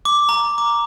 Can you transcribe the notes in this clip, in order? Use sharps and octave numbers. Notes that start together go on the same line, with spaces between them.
D6
A#5
D6